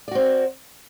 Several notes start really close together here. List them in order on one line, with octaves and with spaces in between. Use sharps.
D5 F#4 C4